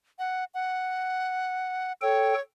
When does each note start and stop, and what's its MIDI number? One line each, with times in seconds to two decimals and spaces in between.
0.19 0.44 78
0.54 1.92 78
2.02 2.34 69
2.02 2.40 73
2.02 2.34 79